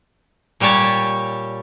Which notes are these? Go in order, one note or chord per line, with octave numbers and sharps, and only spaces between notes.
A#2 G3 G4 C#5 A5